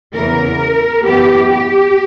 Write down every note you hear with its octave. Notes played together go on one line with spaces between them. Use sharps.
E2 C#3 E3 B3 A#4
F#2 E3 B3 G4
G4